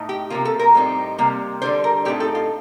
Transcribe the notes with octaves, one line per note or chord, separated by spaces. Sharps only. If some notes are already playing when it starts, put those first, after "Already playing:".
Already playing: A2 A3 D#4
G4
C3 F3 A#3 F4
A4
A#4
A2 G3 C4 D#4
C3 G3 A#3
D3 G3 D4 C5
A#4
A2 A3 C4 D#4 G4
A4
F4